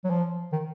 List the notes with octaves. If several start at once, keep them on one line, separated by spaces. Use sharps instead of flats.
F#3
F3
D#3